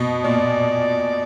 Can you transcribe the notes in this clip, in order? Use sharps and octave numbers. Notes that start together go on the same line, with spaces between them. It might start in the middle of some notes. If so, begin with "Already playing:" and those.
Already playing: B2
A#2 D5